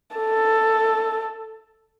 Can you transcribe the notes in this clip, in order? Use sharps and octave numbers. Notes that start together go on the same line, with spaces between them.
A4